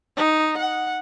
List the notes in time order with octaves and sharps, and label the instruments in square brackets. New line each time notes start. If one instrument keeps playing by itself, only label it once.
[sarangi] D#4
F#5